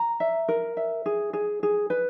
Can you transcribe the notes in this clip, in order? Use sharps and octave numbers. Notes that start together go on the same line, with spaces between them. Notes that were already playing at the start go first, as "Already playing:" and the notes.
Already playing: A#5
E5
A#4
E5
G#4
G#4
G#4
B4